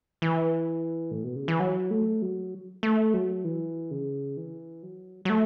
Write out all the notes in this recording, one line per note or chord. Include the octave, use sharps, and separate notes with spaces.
E3
A2
B2
C#3
E3
F#3
A3
F#3
A3
F#3
E3
C#3
E3
F#3
F#3
A3